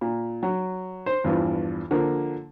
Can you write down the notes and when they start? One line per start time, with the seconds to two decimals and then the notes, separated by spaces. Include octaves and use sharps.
0.01 A#2
0.43 F#3
1.06 C5
1.24 E2 G2 E3 F3
1.91 D3 F3 A#3